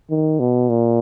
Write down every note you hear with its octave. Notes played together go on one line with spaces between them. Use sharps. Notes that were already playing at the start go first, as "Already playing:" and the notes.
D#3
B2
A#2